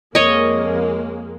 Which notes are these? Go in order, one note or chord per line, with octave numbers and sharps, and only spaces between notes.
F2 G#3 A#3 C#5 D#5